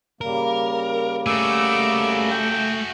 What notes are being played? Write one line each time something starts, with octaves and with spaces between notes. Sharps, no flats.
C#3 G3 A#3 A#4
A3 F#4 G#4 D6 E6
G5